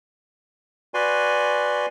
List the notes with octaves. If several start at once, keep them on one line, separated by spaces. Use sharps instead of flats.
F#4 B4 D5 G#5 C6